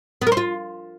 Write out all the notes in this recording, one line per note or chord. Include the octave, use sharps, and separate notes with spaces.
B3
A#4
C5
F4